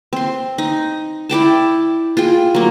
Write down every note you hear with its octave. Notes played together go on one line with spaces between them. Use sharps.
C4 C6
D#4
E4 D5 G5 A5
F4 G#4 G5
F#3 A#3